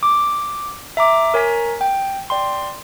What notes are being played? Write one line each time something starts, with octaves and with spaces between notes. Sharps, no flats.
D6
E5 A#5 D6
A#4 C#5 G#5 A#5 B6
G5
D5 G5 C6